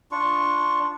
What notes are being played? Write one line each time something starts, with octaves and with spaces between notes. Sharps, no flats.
D4 F4 C#6